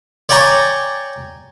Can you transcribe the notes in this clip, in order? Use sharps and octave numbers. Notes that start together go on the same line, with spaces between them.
C#5 D5 G5 G#5 A#5 C#6